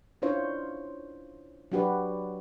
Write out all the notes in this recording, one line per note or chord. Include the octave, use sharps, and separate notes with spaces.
C#4 D4 E4 F4 C5 C#5
F#3 D4 F#4 G4 B4 D5